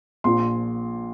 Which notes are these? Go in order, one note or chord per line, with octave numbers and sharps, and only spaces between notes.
A#1 A#2 F3 C6